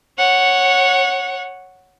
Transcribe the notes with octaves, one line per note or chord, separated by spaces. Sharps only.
C#5 F#5